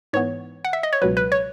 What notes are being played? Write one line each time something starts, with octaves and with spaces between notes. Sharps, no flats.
G#2 E3 B3 C#5
F#5
E5
D#5
C#5
C#2 B2 F#3 B4
B4
C#5